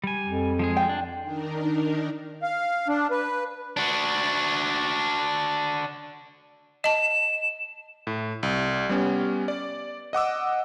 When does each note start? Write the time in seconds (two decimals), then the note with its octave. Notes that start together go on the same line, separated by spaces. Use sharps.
0.04 G3 G#5
0.25 F2
0.59 F3 G#3 G#4
0.77 G5
0.89 D4
1.22 D#3 D4 D#4 A#4
2.42 F5
2.88 D4
3.11 B4
3.77 D4 F#4
6.84 D#5 A5 E7
8.07 A2
8.43 C2
8.89 G3 B3 C#4
9.48 D5
10.13 D#5 F#5 D6 E6